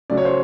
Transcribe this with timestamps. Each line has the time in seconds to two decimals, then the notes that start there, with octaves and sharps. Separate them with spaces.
0.10 C#3 F#3 A3 D5
0.17 C#5
0.25 C5